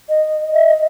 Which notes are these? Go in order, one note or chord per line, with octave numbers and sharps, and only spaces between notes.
D#5
E5
D#5